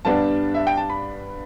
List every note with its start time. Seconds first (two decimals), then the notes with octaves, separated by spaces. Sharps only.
0.05 G2 G3 B3 D4 A5
0.54 E5
0.67 G5
0.77 A5
0.90 B5